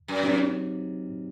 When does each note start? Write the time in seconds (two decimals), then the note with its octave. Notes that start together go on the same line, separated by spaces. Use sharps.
0.08 F#2
0.23 F#3 C4 D#4 G4